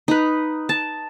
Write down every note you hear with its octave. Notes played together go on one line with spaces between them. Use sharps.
D#4 B4
A5